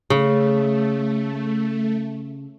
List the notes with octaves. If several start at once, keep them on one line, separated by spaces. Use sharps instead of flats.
C#3 A3